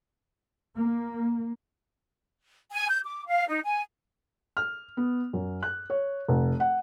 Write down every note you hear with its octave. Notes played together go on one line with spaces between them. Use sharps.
A#3
G#5
G6
D6
F5
D#4
G#5
F6
B3
F#2
F#6
C#5
F1
F#5